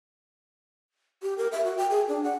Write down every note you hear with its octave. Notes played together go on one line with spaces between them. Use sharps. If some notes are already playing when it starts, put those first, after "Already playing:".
G4
A#4
E5
F#4
G5
G#4
D4
F#5